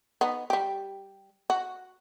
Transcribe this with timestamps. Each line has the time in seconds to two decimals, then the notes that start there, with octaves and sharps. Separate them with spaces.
0.21 B3 D#4
0.50 G3 G4
1.50 F#4